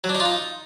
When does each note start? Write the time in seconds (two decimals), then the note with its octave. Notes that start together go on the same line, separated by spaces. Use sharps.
0.04 F#3
0.09 D4
0.15 D#4
0.20 F4
0.25 D#4